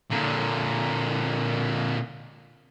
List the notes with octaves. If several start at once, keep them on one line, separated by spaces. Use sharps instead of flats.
A#2 D3